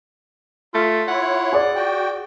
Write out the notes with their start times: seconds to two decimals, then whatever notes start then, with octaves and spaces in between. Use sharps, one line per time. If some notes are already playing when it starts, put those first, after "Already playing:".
0.74 A3 F4
1.08 E4 C#5 F#5
1.52 G#4 D5 D6
1.75 F#4 G5